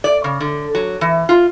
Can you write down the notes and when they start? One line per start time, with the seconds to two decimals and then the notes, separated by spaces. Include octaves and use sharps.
0.04 D5
0.24 C#3
0.40 D3
0.75 F#3
1.01 E3
1.29 F4